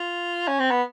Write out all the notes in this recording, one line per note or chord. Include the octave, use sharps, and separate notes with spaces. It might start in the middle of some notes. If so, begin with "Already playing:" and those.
Already playing: F4
C#4
C4
B3